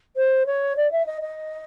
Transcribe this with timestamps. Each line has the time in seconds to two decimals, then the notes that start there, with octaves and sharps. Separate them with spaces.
0.17 C5
0.46 C#5
0.77 D5
0.92 E5
1.06 D#5
1.22 D#5